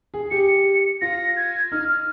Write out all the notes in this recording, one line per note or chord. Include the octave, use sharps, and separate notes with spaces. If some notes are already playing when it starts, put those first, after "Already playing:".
G#4
G4 C#7
F4 A#6
G#6
D#4 F6
F6